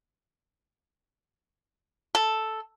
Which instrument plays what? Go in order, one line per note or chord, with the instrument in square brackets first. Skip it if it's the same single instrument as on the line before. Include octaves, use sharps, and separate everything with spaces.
[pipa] A4